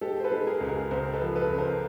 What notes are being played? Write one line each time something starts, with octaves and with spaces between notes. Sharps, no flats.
G#3 G4 A4
C5
A4 B4
G#3
G#4 A#4
C#2
G#4 A#4
C#2 A#4 C5
A4 B4
F3
A4 B4
C#2
A#4 C5